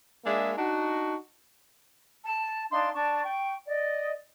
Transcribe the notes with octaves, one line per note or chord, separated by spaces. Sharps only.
G#3 A#3 D4 G#4 E5
D4 D#4 F#4
A5
D4 D#4 F5 C6
D4 A5 C#6
G5 C#6
D5 D#5